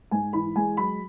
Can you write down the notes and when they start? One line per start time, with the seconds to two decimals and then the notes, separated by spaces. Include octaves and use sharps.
0.11 G#2 G#5
0.33 E3 B5
0.56 G#3 G#5
0.77 F#3 B5